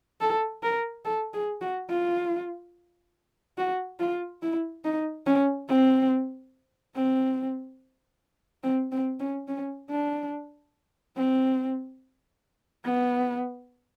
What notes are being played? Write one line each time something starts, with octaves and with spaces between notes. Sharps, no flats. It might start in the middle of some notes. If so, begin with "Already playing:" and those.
A4
A#4
A4
G#4
F#4
F4
F#4
F4
E4
D#4
C#4
C4
C4
C4
C4
C#4
C#4
D4
C4
B3